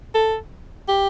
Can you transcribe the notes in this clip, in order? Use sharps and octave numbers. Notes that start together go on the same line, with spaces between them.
A4
G4